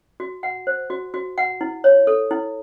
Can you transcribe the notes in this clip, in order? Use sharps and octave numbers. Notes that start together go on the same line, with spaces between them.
F#4
F#5
C5
F#4
F#4
F#5
E4
C#5
A4
E4